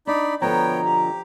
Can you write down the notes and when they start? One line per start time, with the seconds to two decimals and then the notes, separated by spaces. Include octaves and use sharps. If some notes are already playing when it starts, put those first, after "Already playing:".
0.07 D4 D#4 D5 B5
0.42 B2 D3 F3 B3 C#5 G5 A#5
0.85 G4